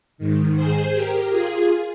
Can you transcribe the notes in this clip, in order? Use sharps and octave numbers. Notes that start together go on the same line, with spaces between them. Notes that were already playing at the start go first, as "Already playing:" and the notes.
G#2 D#3
G#4 C5
G4 A#4
F4 G#4